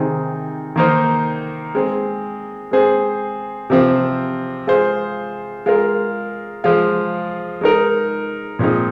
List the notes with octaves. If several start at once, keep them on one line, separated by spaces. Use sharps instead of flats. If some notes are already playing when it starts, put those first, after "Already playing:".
Already playing: C3 D#3 C4 D#4 G#4
D#3 A#3 D#4 C5
G#3 C4 G#4
G#3 C4 G#4 C5
C3 F3 C4
G#3 F4 G#4 C5
G#3 F4 A#4
F3 G#3 F4
G#3 D#4 A#4
A#2 F3 G#3 C4 D#4